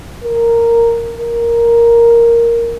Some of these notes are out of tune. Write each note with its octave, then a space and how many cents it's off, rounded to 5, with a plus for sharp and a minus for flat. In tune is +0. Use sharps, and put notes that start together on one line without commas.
A#4 -10
A#4 +0